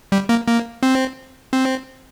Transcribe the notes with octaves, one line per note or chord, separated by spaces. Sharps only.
G3
A#3
A#3
C4
C4